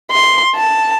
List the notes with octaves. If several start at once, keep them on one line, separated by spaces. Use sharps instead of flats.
C6
A5